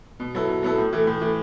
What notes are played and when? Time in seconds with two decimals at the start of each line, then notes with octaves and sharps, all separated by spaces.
0.20 B2
0.35 F#3 B3 E4 A4
0.49 B2
0.63 F#3 B3 E4 A4
0.78 A2
0.93 E3 A3
1.07 A2
1.21 E3 A3